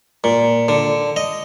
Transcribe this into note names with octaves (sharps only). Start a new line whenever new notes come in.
A#2
D3
D#5